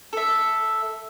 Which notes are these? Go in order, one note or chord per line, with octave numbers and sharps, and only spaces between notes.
A4 E5